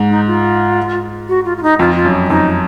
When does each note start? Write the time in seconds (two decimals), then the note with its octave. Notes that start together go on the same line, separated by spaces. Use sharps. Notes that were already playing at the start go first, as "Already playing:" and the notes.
Already playing: G#2
0.09 D#4
0.27 F4
1.28 F#4
1.45 F4
1.57 F4
1.62 D#4
1.79 F2 F4
1.95 F4
2.05 F#2
2.30 F2 D#4